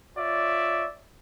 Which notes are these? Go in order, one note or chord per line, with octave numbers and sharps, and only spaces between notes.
F4 C#5 D5 E5